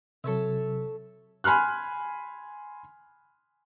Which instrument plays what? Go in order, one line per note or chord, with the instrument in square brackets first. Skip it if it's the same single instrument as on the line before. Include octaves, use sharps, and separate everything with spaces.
[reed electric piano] C3 F#3 [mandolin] A4 C#5 E5
[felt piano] G#5 B5 C6 F6 F#6